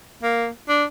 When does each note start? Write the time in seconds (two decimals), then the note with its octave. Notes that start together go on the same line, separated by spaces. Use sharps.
0.23 A#3
0.69 D4